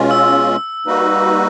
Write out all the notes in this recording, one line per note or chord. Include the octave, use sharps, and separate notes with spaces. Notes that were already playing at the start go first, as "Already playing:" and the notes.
Already playing: B2 G#3 C#4 F4
E6
G3 A#3 D#4 F#4 B4